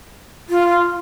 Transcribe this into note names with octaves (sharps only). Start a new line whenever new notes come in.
F4